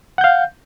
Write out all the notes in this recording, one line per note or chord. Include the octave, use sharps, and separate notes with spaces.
F5 F#5 G6